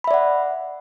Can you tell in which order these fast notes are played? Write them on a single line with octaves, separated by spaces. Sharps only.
B5 E5 D5 F#5